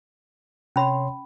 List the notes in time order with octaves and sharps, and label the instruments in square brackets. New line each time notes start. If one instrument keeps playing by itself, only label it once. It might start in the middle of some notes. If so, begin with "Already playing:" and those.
[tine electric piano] C3 C#5 C6 [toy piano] C#4 B5